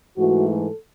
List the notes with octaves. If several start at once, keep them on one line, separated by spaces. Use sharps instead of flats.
G#2 E3 A3 F#4
A4